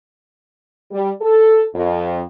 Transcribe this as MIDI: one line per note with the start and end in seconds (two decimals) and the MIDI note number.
0.91 1.10 55
1.21 1.64 69
1.75 2.23 41